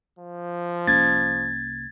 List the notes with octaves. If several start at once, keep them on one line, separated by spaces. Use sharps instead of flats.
F3
C2 A#3 C#4 G#6 A6